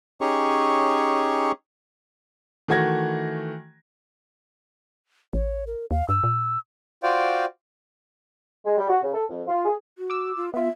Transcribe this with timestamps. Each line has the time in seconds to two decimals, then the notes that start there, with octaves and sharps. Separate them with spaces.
0.21 C#4 D#4 G4 G#4 C#5 C#6
2.68 D#3 E3 A3 F#4 G#6 A#6
5.33 A1 C#5
5.67 A#4
5.91 D#2 F5
6.09 G2 E6
6.23 A#2
7.03 F4 F#4 C5 D5 F5 G5
8.65 G#3
8.77 G3
8.89 F#4
9.02 C#3
9.13 A4
9.29 F2
9.47 F4
9.65 G#4
9.98 F#4
10.10 D6 E6
10.36 F4
10.54 B3 F4 E5